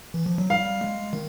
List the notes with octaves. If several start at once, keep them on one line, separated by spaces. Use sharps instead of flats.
E3
F3
F#3
G3 F5
G#3
D#3